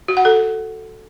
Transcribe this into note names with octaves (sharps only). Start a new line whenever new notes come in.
F#4
F#5
A4